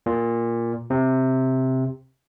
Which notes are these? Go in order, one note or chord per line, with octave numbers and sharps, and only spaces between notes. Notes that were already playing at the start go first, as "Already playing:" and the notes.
A#2
C3